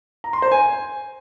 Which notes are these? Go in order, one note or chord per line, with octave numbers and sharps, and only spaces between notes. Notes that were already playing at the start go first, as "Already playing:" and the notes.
A#5
C6
C5
G#5